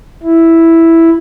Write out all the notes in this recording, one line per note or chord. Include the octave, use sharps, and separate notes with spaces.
E4